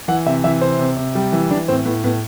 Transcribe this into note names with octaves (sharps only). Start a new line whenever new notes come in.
E3 F#5
C3 E5
E3 E5
C3 C5
C3
C3
G3
E3
E3 D4
A2 C4
A2 B3
A2 B3